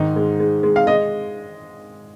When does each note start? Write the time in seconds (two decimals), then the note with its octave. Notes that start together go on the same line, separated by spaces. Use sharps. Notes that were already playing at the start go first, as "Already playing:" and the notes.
Already playing: G#2 D#3 D#4
0.16 G#3
0.40 G#3
0.63 G#3
0.76 F5
0.87 G#3 D#5